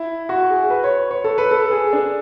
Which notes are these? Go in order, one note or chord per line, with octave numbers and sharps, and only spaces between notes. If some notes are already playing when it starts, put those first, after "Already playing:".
Already playing: E4
F#4
G#4
B4
C#5
C#5
A4
B4
A4
G#4
D4